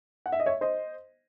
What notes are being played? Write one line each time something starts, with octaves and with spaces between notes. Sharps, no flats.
F#5
E5
D#5
C#5 E5
C5 D#5